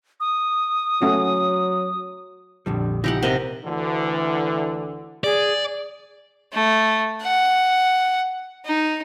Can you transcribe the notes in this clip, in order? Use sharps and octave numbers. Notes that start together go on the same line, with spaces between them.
D#6
F#3 A3 C#4 F#4
A#1 F2 D3 G3
C#3 F3 D#4 E4 G4 F#5
C3 A#4 D#5 E5 F#5
D2 D3 E3
G#4 D5
A3
F#5
D#4